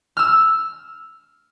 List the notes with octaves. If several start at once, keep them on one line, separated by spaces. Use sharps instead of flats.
E6 F6